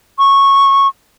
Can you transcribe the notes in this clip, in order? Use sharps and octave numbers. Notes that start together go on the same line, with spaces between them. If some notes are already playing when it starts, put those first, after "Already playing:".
C#6